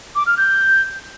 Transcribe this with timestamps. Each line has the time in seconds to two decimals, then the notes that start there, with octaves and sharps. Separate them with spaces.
0.15 D6
0.27 F6
0.38 G6